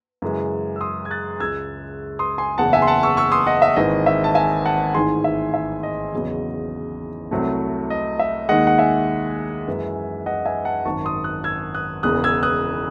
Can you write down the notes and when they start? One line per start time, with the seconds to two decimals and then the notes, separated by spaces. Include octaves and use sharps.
0.22 F#2 C#3 E3 G#3
0.76 E6
0.81 C6 D#6
1.05 G#6
1.11 F#6 A6
1.40 C#2 C#3 G#3 E6 G#6
2.19 C6 D#6
2.38 G#5 C6
2.58 F#1 E2 C#3 F#5 A5
2.73 E5 G#5
2.82 C6
2.87 F#5 A5
3.03 C#6 E6
3.17 C#6 E6
3.32 C6 D#6
3.47 D#5 F#5
3.62 E5
3.76 G#1 G#2 E3 D#5
4.06 E5
4.24 A5
4.35 E5 G#5
4.66 F#5 A5
4.95 A1 G#2 D#3 G#3 G#5 C6
5.24 E5
5.54 E5
5.83 D#5
6.13 E2 C#3 F#3
7.31 C2 C3 F#3 A3
7.90 D#5
8.19 E5
8.49 D#2 D#3 G#3 D#5 F#5
8.67 F#5
8.78 E5 G#5
9.68 F#2 E3 G#3
10.26 D#5 F#5
10.45 E5 G#5
10.65 F#5 A5
10.85 G#1 F#2 D#3 A5 C#6
11.05 C6 D#6
11.24 D#6 F#6
11.44 E6 G#6
11.74 D#6 F#6
12.03 E1 E2 C#3 D#6 F#6
12.24 E6 G#6
12.43 D#6 F#6